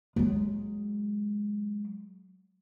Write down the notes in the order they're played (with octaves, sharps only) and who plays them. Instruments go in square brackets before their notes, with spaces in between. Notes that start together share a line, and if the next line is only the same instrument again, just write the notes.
[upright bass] F#3 G#3